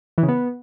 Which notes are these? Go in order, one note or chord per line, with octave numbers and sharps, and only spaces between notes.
E3
C#3
B3